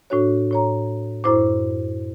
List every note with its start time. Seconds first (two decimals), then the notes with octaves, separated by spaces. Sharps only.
0.10 A2 D4 F#4 C#5
0.51 A2 C#5 A#5
1.24 F#2 A2 E4 C5 D6